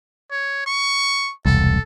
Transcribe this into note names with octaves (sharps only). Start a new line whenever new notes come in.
C#5
C#6
E1 C2 A4